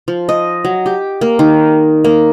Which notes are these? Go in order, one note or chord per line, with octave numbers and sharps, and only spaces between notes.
F3
D#5
F#3
G4
A#3
D#3
A#3